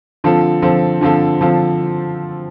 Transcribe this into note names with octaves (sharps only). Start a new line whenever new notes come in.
D3 F3 C4 F4 A4
D3 F3 C4 F4 A4
D3 F3 C4 F4 A4
D3 F3 C4 F4 A4